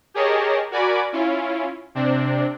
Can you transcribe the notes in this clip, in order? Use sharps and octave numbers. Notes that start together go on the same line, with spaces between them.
G4 G#4 A#4 C#5 D#5 A5
F#4 A#4 D5 G#5 B5 D6
C#4 E4 F4
C3 C4 D4